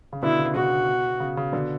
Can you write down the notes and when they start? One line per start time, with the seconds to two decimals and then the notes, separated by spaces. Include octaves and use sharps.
0.13 C#3
0.23 B2 D3 E4
0.39 C#3
0.55 B2 F#4
1.20 C#3
1.37 C#3
1.52 B2 D3